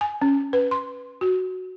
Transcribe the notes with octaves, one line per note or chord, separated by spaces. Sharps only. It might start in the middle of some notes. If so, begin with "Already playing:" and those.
G#5
C#4
B4
C6
F#4